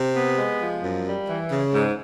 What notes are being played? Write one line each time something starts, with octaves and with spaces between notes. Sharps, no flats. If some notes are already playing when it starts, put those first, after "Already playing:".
Already playing: C3
B3
G#3
F3
F#2
G3
E3
C#3
G#2